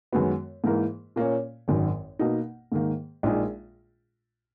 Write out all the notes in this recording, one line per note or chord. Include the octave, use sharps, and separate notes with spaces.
F#2 D#3 G#3 B3 F#4
G#2 E3 A#3 E4 A#4
A#2 A#3 C#4
G#1 F#2 D#3
B2 A#3 D#4
G#2 D#3 A#3
A#1 A#2 G#3 D#4 G#4